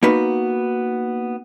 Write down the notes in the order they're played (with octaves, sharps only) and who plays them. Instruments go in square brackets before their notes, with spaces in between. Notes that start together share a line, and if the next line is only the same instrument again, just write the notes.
[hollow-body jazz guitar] A#3 B3 D#4 F#4 B4